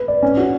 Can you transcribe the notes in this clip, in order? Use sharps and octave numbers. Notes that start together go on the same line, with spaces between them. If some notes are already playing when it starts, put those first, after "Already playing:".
Already playing: B4
D5
C#4
F#4